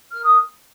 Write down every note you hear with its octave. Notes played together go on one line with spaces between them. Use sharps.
A#4 F6
D#6